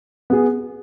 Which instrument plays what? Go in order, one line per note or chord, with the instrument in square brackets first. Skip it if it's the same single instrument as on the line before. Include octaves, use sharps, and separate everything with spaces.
[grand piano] B3 G#4